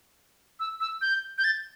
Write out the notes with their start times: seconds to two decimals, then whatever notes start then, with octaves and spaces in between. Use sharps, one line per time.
0.60 E6
0.80 E6
1.02 G6
1.38 G6
1.44 A6